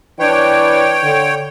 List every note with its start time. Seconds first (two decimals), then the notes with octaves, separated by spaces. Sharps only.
0.19 E3 D4 B4 C#5 G5
1.03 D3